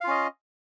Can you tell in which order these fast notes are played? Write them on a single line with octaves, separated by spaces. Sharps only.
F5 F4 C#4 D#5